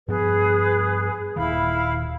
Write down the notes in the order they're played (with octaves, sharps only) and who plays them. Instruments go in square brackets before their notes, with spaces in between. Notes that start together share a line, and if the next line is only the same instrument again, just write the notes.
[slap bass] G2 F3 B3 [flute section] G#4 B4
[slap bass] D#1 D#2 D#3 [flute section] E4 F5 B5